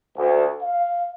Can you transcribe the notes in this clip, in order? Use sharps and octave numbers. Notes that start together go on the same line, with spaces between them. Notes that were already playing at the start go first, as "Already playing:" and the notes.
D2
F5